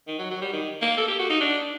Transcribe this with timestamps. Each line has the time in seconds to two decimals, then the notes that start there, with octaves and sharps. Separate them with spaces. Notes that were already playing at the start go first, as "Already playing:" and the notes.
0.07 D#3
0.18 F#3
0.30 F#3
0.41 G3
0.53 D#3
0.82 A#3
0.97 A4
1.07 G4
1.19 F#4
1.30 D#4
1.40 D4